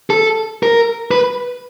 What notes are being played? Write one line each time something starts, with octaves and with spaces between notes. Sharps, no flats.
A4
A#4
B4